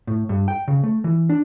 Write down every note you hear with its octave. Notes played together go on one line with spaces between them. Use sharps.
A2
G2
G5
C#3
A3
E3
D4